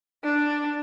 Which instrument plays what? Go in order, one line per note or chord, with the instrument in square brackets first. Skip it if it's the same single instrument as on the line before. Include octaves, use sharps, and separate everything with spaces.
[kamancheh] D4